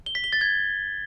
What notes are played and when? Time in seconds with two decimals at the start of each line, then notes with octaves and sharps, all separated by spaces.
0.06 G7
0.15 B6
0.24 G7
0.33 A6
0.41 G#6